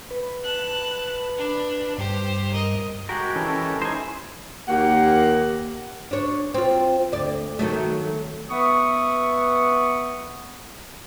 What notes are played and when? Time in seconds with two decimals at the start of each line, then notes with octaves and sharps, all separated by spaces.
0.11 B4
0.44 A5 F#6
1.38 D4
1.98 G2 G4 C5
2.52 A#4 D#5
3.09 G#3 F#4 G4 A#4
3.36 E3 C#4 A4
3.82 D#4 E4 C5 G#5
4.68 D#2 A#3 G4 F#5
6.11 D4 C#5
6.54 C4 F4
7.12 D2 D5
7.59 D#3 F#3 A3
8.50 B3 B4 E5 F#5 C#6 D#6